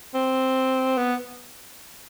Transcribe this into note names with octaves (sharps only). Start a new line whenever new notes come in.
C4
B3